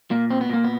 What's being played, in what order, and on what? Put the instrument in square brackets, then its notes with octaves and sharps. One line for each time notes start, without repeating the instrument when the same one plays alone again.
[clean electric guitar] A#2 A#3
C4
B3
A#2 A#3
B3